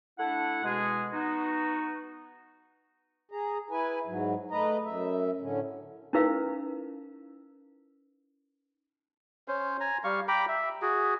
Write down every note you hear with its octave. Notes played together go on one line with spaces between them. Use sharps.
A3 D4 E4 F#5
B2 G#3 G#4
B3 D#4 F#4
G#4 A#5
E4 B4 G#5
G#2 F#3
A3 B4 D#5 A#5
F#2 E5
A2 D3 C#4
C#4 D#4 E4 A#4 B4 F5
C#4 C5
G#5 A#5
G3 F5 C#6
G5 A#5 B5 D6
E5
F#4 G#4